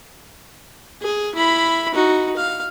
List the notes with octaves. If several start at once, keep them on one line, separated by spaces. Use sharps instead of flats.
G#4
E4 B5
D#4 F#4
F5